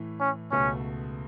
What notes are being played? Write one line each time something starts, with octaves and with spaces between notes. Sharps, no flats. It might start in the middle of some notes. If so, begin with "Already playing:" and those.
Already playing: A2 E3 A3
C#4
C#2 B2 A3 C#4